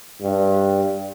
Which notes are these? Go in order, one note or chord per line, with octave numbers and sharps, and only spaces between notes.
G2